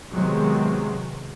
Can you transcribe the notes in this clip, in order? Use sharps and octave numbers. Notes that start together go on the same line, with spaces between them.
C3 D#3 F#3 G#3 B3 C4